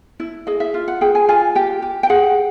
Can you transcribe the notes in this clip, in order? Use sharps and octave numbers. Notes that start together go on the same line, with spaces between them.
E4
G#4 D#5
E5
F4
F#5
G#4 G5
G#5
F4 G#5
G4 G5
G4
G5
G#4 F#5